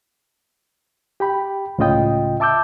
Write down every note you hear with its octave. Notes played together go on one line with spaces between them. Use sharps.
G4 G5 B5
C#2 A2 C#3 F4 D#5 G5
E5 A5 D6 E6 G6